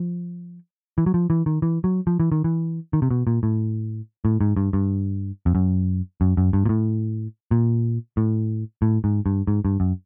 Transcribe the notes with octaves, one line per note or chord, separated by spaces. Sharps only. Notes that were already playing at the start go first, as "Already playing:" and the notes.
Already playing: F3
E3
F#3
F3
E3
D#3
E3
F#3
F3
E3
D#3
E3
D#3
C3
B2
A#2
A2
A2
G#2
G2
G2
F2
F#2
F#2
F#2
G2
A#2
A2
A#2
A2
A2
G#2
G2
G#2
G2
F#2